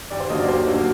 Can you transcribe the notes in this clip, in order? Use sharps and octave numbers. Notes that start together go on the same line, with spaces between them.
D#2 D5
C5
D3 F#3 A#3 D#5
D5
D#2 C5
D3 F#3 A#3